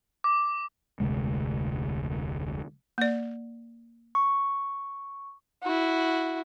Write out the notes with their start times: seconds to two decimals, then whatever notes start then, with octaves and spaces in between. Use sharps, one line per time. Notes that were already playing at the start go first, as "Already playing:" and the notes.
0.24 D6
1.00 F1 D2 C3 G#3
2.98 A#3 D5
4.15 C#6
5.64 E4 F#4